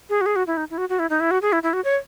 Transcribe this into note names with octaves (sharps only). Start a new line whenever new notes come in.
G#4
F#4
G#4
F#4
E4
D#4
E4
F#4
F#4
E4
D#4
E4
F#4
G#4
E4
E4
F#4
C#5